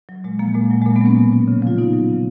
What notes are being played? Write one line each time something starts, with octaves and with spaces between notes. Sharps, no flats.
F#3
A#2 G#3
F3 A#3
A#2 G#3
F#3
G#3
A#2 A#3
G#3 B3
F#3 A#3 C#4
B2
F#3
C#3
F3 F4
A#2 B3 D#4
F#3
C#3